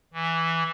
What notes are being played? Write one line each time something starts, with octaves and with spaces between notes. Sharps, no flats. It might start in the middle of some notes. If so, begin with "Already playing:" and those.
E3